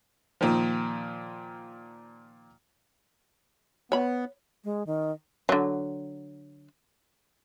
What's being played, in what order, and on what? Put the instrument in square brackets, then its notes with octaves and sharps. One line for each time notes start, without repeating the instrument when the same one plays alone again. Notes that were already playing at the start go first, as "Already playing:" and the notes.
[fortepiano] A#2 D#3 F3
[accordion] B3 [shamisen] C#5 B5
[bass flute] G#3
D#3
[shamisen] D3 F#3